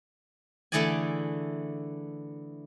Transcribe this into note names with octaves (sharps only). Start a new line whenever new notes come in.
D3 E3 A3 G#4 D5 G#5